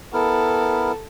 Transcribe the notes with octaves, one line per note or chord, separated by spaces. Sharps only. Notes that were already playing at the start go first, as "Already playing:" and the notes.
B3 E4 A4 A#4